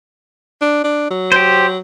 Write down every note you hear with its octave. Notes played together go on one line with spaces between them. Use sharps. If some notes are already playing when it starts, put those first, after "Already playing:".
D4
D4
F#3
G4 C5